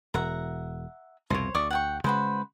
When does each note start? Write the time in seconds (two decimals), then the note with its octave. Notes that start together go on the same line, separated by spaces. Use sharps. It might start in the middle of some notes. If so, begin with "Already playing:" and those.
0.14 E1 E5 F#5 A#5
1.30 C2 F2 B2 C5 C#5
1.54 D2 D5 C#6 D#6
1.71 F#5 G5 C#6
2.04 C#3 G#3 F#4 B4 C5